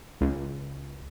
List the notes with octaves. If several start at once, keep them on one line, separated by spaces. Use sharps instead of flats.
C#2